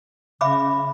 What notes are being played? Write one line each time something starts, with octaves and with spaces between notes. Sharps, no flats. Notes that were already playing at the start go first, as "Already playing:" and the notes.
C#3 E5 B5 D6